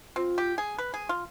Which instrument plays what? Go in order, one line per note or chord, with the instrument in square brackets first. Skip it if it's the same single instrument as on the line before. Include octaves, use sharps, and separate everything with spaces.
[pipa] C4 [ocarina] F4
[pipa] G4
G#4
B4
G#4
F4